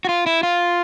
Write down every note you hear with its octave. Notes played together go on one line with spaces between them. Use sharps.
F#4
F4
E4
F4